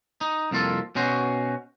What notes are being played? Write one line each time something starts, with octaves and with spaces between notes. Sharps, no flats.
D#4
C2 F2 A#3 F4 A4
B2 C#4 F#4 C5